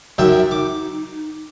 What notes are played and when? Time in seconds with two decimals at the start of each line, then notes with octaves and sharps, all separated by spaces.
0.18 F#2 D#4 E5 G5
0.51 D6